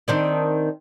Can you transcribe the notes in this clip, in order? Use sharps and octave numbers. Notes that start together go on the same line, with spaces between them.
D#3 C4 D4